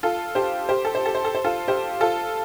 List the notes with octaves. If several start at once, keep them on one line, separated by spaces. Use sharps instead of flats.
F4 A4
G4 C5
G4 C5
A4
C5
A4
C5
A4
C5
F4 A4
G4 C5
F4 A4